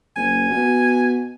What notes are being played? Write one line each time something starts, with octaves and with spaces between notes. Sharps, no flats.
F#1 G#5
B2